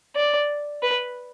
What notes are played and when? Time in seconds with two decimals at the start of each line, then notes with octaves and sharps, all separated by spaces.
0.16 D5
0.82 B4